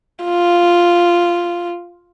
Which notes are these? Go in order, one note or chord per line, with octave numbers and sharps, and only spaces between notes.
F4